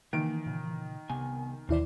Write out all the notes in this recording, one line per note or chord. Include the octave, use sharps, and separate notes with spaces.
D#3 E3 A#3 D7
A#2 C#3
C2 C3 B3 G#5
D#2 B2 E3 E4 C5 D5